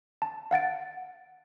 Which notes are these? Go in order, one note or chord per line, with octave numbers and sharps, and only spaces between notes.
A5
F5 F#5 A6 D7